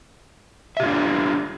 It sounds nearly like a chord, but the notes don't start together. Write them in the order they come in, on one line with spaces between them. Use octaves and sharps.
E5 G4 F4 D4